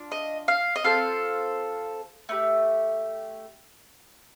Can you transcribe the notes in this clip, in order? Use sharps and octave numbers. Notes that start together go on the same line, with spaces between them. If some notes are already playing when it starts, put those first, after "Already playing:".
Already playing: D4 F4
D#5
F5
D#5
C4 F4 A4 F5
A3 D#4 G4